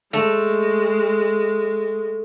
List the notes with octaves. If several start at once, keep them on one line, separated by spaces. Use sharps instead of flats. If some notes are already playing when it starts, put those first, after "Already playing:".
G#3 A3